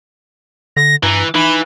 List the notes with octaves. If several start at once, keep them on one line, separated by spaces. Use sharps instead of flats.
D3 A#6
G2 E3 A#5
E3 D#4 B5